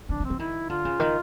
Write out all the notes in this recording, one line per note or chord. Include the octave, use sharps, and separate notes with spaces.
E3 D4
E3
C4
E3
D#3 E4
D3 F4
C#3
D#3